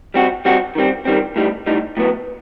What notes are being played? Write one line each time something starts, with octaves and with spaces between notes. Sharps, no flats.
G3 C4 F#4
G3 C4 F#4
D#3 G3 C4
D#3 G3 C4
A2 G3 D#4
A2 G3 D#4
A2 F#3 B3